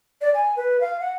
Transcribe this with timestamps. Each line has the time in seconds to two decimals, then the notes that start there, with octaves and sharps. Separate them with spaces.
0.21 D5
0.34 G#5
0.57 B4
0.81 F5
1.00 F#5